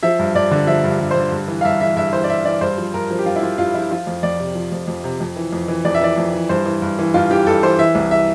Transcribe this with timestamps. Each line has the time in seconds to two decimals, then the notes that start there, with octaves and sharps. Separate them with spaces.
0.03 F3 E5
0.19 G2
0.35 G2 D5
0.51 D3
0.67 F3 E5
0.84 G2
1.00 G2
1.11 C5
1.16 D3
1.32 G2
1.48 E3
1.61 F5
1.64 G2 E5
1.81 E3 E5
1.96 G2 E5
2.13 E3 C5
2.24 D5
2.29 G2 E5
2.45 E3 D5
2.61 G2 C5
2.78 F3
2.94 G2 A#4
3.11 F3
3.19 G4
3.26 G2 F4
3.36 E4
3.43 F3 F4
3.58 G2 F4
3.74 F3 E4
3.91 F3 F4
4.07 F2
4.23 F2 D5
4.40 C3
4.55 F3
4.72 F2
4.87 F2
5.04 C3
5.20 F2
5.36 E3
5.52 F2
5.68 E3
5.85 F2 D5
5.95 E5
6.01 E3 D5
6.18 F2
6.33 E3
6.49 G2 C5
6.66 E3
6.82 G2
6.99 E3
7.14 G2 F4
7.31 E3 G4
7.47 G2 A4
7.63 E3 C5
7.79 E3 E5
7.95 C2
8.11 E5